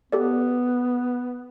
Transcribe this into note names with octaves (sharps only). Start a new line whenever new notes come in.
B3 G4 A4 D5